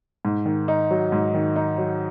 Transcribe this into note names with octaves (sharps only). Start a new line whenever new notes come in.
G#2
D#3
D#4
F#3
G#2
D#3
D#4
F#3